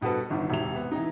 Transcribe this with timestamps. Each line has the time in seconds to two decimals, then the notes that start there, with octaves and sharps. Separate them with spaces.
0.01 G2 B2 F#4 A4 B4
0.30 G1 D3 D#3
0.50 E1 C3 E4 F7
0.76 B3
0.92 E3 D#4